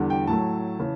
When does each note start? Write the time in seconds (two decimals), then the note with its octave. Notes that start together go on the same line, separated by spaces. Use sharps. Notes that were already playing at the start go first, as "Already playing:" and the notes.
Already playing: E2 D3 G3
0.10 G5
0.27 A2 F#3 A3 A5
0.80 C#3 E3